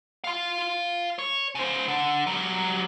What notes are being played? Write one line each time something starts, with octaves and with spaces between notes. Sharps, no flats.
F5 C6
C#5
C#3 C5
D3
F#3 G3